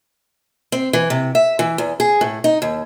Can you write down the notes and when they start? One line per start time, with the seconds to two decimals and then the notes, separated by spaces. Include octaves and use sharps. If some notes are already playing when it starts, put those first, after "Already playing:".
0.72 C4
0.93 E3
1.10 C3
1.35 E5
1.59 E3
1.78 E2
2.00 G#4
2.21 A2
2.44 D#4
2.62 D#2